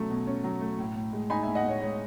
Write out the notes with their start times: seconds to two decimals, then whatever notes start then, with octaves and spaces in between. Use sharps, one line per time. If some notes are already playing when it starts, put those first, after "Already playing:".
Already playing: B2 F#3 A3 C#4
0.10 B2
0.27 C#4
0.44 F#3
0.61 A3
0.79 A2
0.96 A2
1.13 G#3
1.30 D#4 G#5 B5
1.43 A2 E5 G#5
1.55 D#5 F#5
1.64 A2 C#5
1.82 G#3 C#5